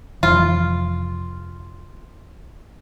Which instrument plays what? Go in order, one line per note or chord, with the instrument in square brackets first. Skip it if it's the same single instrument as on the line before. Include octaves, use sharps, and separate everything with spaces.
[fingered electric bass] F1 E3 F3 [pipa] F4